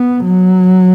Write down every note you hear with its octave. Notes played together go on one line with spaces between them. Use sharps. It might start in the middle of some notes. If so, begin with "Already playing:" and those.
Already playing: B3
F#3